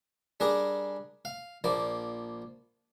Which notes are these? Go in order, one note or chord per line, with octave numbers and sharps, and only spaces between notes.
G3 D4 G#4 A#4
F5
A#1 F3 A#3 D5